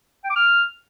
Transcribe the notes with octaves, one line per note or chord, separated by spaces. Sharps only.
G5
D6
F6